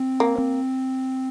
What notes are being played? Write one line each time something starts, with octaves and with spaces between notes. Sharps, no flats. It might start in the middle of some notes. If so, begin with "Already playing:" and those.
Already playing: C4
A#3
C4